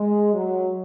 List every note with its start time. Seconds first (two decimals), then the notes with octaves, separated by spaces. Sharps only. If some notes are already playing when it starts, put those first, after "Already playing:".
Already playing: G#3
0.33 F#3